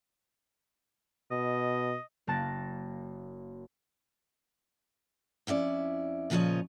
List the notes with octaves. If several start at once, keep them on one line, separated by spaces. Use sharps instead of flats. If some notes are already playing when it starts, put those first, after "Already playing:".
B2 D#5
F#1 A#3 A5 F#6 A6 A#6
F2 C#4 E4 D5
A#2 C#3 F3 F4 C#5 D#5